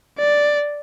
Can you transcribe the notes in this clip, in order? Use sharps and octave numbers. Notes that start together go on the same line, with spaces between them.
D5